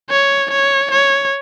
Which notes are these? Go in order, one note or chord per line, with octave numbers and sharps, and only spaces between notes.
C#5
C#5
C#5